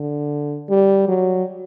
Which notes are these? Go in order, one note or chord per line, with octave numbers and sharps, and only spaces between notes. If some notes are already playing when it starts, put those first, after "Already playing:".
Already playing: D3
G3
F#3